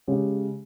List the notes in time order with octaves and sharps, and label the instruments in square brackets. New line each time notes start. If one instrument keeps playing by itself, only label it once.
[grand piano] C#3 G#3 C#4 G4